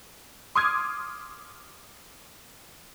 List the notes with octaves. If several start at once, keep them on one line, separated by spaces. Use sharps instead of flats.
C6 D6 D#6 F6 G#6